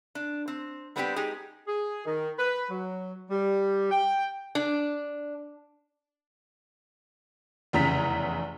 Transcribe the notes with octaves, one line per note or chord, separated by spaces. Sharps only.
D4
C4
G3 B3 C4 D4 E4 G4
G#3 D#4 G4 G#4
G#4
D#3
B4
F#3
G3
G5
D4
F1 E2 C#3 A#5 B6